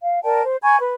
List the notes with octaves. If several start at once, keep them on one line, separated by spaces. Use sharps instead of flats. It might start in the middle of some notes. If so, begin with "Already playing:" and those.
F5
A#4 D5 G5 A5
C5
G#5 B5 C#6 G#6
B4